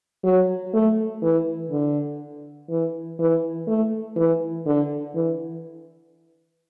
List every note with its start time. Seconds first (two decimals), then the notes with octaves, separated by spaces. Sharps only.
0.24 F#3
0.73 A3
1.22 E3
1.71 D3
2.69 E3
3.19 E3
3.67 A3
4.16 E3
4.66 D3
5.15 E3